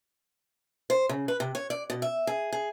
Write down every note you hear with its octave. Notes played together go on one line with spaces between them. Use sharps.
C5
C#3
B4
C3
C#5
D5
B2
E5
G#4
G#4